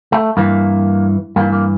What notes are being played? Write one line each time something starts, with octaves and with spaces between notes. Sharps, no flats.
A3
G2 E3 A#3
G2 E3 A#3
A#3